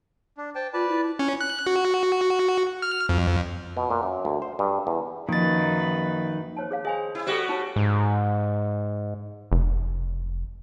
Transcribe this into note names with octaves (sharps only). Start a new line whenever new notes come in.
D4
C5 G5 A5
F4 B4 D5 A5
E4
C#4
F#6
F#4
F6
F2
B2
A#2
F#2
D2
C5
G2
E2
F#2 D#3 F3 A#3 D#4 B4 A6
C5 C#5 A5
G#4 C#5 F5
G#4 C5 D#5 G#5
E4
G3 F#4 G4 A4 C5
D#4 C#5
G#2
F1